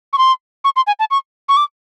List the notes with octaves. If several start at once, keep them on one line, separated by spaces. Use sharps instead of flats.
C#6
C6
C#6
C6
G#5
A5
C#6
C#6
D6